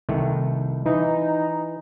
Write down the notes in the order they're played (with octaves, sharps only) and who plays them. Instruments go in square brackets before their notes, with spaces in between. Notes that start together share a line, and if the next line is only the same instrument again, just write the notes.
[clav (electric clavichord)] C2 D#3 A3
[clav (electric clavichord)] E3 [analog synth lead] D#4